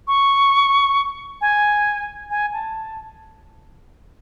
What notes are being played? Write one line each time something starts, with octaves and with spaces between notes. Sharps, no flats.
C#6
G#5
G#5
A5